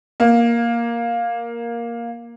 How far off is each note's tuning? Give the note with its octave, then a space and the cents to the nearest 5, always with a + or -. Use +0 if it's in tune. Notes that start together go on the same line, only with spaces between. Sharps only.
A#3 +5